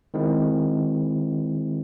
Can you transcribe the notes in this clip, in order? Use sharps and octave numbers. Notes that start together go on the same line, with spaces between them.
D#3 G#3 C4 E4